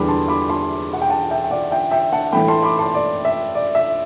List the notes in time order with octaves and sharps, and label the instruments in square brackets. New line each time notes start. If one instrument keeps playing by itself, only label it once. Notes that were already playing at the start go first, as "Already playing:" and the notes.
Already playing: [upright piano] E2 D3 G3 B3 D4 B5 D6
A5 C6
B5 D6
A5 C6
F#5
G5
F#5 A5
E5 G5
G5
D5 F#5
E5 G5
E5 G5
F#5 A5
A2 E3 A3 G5 B5
A5 C6
B5 D6
A5 C6
D5
E5
D5
E5